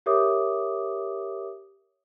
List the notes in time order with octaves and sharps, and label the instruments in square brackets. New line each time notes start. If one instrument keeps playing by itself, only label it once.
[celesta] G4 A#4 C#5 E5 D6 D#6